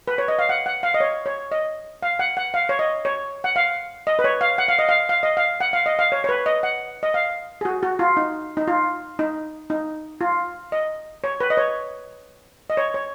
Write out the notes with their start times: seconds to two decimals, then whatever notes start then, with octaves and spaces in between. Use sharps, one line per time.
0.08 B4
0.18 C#5
0.28 D#5
0.39 F5
0.49 F#5
0.66 F#5
0.83 F5
0.94 D#5
1.00 C#5
1.26 C#5
1.52 D#5
2.03 F5
2.19 F#5
2.37 F#5
2.54 F5
2.69 C#5
2.79 D#5
3.05 C#5
3.44 F#5
3.56 F5
4.07 D#5
4.19 B4
4.24 C#5
4.41 F5
4.58 F#5
4.68 F5
4.79 D#5
4.89 F5
5.09 F5
5.23 D#5
5.37 F5
5.60 F#5
5.73 F5
5.86 D#5
5.99 F5
6.12 C#5
6.24 C#5
6.29 B4
6.46 D#5
6.63 F#5
7.03 D#5
7.14 F5
7.61 G#4
7.65 F#4
7.83 F#4
7.99 F4
8.17 D#4
8.57 D#4
8.68 F4
9.19 D#4
9.70 D#4
10.21 F4
10.72 D#5
11.24 C#5
11.40 B4
11.50 D#5
11.57 C#5
12.70 D#5
12.77 C#5
12.94 C#5